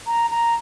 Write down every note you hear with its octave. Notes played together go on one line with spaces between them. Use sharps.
A#5
A#5